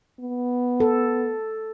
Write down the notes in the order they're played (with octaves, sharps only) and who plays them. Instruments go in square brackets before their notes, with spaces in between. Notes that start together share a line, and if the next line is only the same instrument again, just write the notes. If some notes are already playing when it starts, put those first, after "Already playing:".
[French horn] B3
[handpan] A4